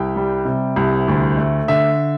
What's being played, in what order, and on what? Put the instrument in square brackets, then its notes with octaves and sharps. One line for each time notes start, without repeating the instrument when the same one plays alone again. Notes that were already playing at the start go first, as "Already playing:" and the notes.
Already playing: [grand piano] C2 G5
G3
C3
C2
D2
A3
D3 E5